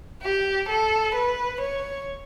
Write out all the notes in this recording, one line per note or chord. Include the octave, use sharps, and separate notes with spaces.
G4
A4
B4
C#5